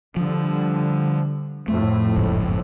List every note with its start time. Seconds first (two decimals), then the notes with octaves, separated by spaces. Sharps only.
0.17 D3 F3 G3
1.68 F2 A2 A3
2.17 F#1 C#2 G#2